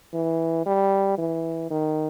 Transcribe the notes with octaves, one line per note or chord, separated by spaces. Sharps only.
E3
G3
E3
D#3